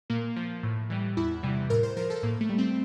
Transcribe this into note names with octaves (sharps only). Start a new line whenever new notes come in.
A#2 A#3
F3
A2
E3 G3
E2 E4
C3 E3 G3
A2 A#4
C5
F3 A#4
A4
A2 A#3
A3
G3
C4